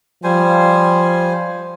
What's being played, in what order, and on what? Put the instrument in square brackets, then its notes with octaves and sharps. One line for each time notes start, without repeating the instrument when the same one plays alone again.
[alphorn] F3 [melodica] G3 C5 G#5